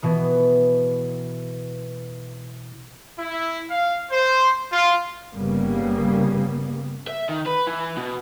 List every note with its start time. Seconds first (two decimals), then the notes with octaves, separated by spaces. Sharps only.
0.02 B2 E3 B3
3.19 E4
3.69 F5
4.11 C5
4.72 F4
5.34 G1 C#3 G3 A#3 B3
7.08 E5
7.29 D#3
7.46 B4
7.67 E3
7.97 B2